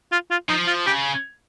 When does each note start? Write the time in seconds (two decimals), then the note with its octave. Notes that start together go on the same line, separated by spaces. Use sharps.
0.12 F4
0.31 F4
0.49 F3 D#4
0.67 F4
0.86 C#3 G4